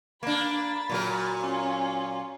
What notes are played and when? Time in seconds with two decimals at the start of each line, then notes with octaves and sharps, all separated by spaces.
0.23 A#3 D4 B5 A6
0.90 A#2 F#3 A#4
1.39 C#4 F4